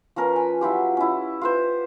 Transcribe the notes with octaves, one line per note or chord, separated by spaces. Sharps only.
F3 C#4 A#4 B4
G#5 B5
F#3 E4 F4 G4
C#4 E4
F4 B4 C5